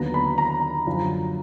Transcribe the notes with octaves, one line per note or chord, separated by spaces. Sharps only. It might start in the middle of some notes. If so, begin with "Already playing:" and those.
Already playing: D#2 D3 F#3 B3 A#5
B5
A#5
F#2 D3 F3